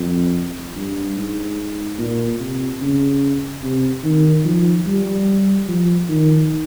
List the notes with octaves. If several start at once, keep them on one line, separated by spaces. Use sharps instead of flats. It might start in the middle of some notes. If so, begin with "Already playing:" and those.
Already playing: F2
G2
G#2
A#2
C3
C#3
C3
D#3
F3
G3
F3
D#3